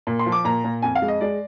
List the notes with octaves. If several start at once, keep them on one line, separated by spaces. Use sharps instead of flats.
A#2
C6
F3
D6
A#2 A#5
A#2
F2 G#5
F5
G#3
D#5
G#3 D5